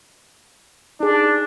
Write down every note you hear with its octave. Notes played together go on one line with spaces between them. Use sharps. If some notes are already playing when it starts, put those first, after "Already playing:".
D4 D#4 G#4